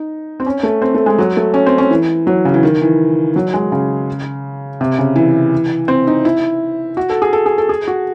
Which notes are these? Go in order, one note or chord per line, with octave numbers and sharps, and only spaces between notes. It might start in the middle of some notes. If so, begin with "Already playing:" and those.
Already playing: D#4
C4
C#4
A3
C4
A3
G#3
F#3
A3
C#4
C4
C#4
E3
F#3
C#3
E3
D#3
E3
F#3
G#3
C#3
C3
C#3
E3
C4
D#4
E4
F#4
A4
G#4
A4
G#4
A4
G#4
F#4